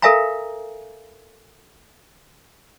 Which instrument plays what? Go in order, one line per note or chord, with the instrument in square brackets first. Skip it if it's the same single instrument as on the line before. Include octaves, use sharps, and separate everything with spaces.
[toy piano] A4 A#4 E5 F5 G#5 A#5